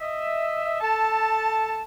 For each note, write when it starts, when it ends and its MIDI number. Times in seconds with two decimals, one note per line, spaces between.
0.01 0.78 75
0.01 0.78 76
0.81 1.81 69
0.81 1.81 81